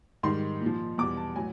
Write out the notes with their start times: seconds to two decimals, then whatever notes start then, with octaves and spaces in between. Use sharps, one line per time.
0.23 G#2 D#3 G3 C6
0.61 A#2
0.66 F3
0.98 E2 B2 G3 D6
1.17 A5
1.36 A2 F#3 G#5